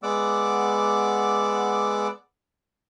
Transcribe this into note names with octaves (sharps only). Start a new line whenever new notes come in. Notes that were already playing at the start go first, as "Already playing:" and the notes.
G#3 B3 D5 F#5 D6 E6